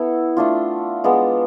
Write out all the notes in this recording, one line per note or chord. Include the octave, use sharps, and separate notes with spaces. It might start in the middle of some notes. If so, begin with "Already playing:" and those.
Already playing: B3 E4 A4
A3 D4 F4
G#3 B3 D4 F4